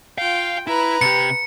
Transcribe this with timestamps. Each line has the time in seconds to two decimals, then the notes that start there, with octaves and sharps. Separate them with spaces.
0.18 F4 F5 G5
0.67 E4 B4 A#5
1.01 C3 G4 C#7